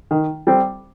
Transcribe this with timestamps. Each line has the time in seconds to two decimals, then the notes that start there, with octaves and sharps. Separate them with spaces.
0.11 D#3
0.47 G3 C4